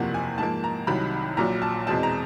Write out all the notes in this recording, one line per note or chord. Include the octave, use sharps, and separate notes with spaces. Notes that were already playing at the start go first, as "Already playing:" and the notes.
Already playing: F#1 E2 C3 F3 A#3 F#5
G#5
G#2 F3 A#3 A5
A#5
C2 C3 D#3 F#3 B5
A#1 A#2 F#3 A#5
A5
E2 B2 G#3 C4 A5
A#5